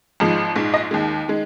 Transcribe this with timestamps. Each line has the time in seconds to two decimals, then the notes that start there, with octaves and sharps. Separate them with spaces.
0.20 G#1 G#2 F3 G#3
0.56 A#1 G#2 G#3
0.74 D#5
0.91 D#2 D#3 G#3
1.28 D#3 G#3